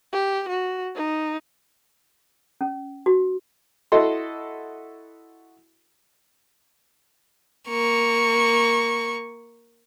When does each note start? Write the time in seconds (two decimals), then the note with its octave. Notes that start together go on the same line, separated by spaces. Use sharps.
0.13 G4
0.48 F#4
0.95 D#4
2.61 C#4
3.06 F#4
3.92 E4 F#4 A4 D#5 C6
7.69 A#3 C#6